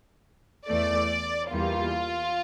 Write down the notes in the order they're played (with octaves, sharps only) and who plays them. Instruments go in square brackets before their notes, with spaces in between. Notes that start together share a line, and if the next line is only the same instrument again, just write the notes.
[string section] E2 E3 A3 D5
E2 E3 G3 A#3 F4